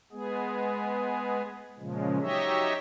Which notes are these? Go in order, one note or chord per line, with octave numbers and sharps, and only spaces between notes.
G#3 B3 G#4
A#2 C#3 F3 G#3
F#3 D#4 G4 C#5 D#5 E5